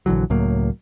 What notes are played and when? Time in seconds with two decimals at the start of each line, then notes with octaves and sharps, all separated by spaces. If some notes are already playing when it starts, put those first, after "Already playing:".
0.06 A#1 D3 E3 F#3
0.30 C#2 A2 F#3 A#3